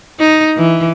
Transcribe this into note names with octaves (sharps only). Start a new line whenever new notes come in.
D#4
E3